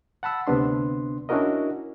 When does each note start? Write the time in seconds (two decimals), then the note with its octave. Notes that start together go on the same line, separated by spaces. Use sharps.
0.23 F#5 A5 B5 E6
0.47 D2 C3 B3 D4 C6
1.29 C#4 D4 E4 F#4 A#4 D#5